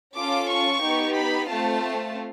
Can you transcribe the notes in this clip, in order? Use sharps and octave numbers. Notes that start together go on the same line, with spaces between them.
C#4 F4 A4 D6
C#6
B3 D#4 G4
B5
A3 C4 F4 A5